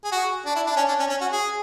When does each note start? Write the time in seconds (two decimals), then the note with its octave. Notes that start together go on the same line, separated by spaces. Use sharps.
0.04 G#4
0.12 F#4
0.45 D4
0.56 E4
0.66 D4
0.77 C#4
0.88 D4
0.99 C#4
1.10 C#4
1.21 F#4
1.32 G#4